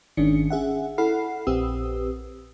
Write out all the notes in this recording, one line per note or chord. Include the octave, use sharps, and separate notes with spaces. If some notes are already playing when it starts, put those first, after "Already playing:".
G#1 G#2 D#3 C#4 D4 C#7
C#4 G#4 E5 F#5
E4 A4 F#5 B5 F6 C7
A#1 C4 G4 B4 D#6 E6